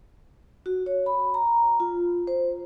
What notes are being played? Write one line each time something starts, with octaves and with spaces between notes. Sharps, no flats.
F#4
C#5
B5
A#5
F4
C5